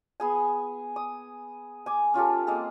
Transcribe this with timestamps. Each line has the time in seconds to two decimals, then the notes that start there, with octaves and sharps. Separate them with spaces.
0.20 B3 G#4 G#5
0.96 D#6
1.86 G#5 D6
2.14 C#4 F4 G4 A4
2.47 G#3 A#3 C4 G#4